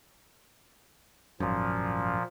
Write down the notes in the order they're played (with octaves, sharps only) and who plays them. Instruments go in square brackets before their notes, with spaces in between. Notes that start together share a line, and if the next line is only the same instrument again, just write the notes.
[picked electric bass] G#1 F#2 [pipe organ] A#2 F3